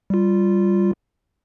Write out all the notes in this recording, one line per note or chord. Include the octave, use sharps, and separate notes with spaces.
G3 F4